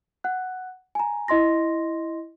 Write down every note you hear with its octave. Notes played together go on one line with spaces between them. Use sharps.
F#5 F#6
G#5 A#5
E4 D#5 C6 A#6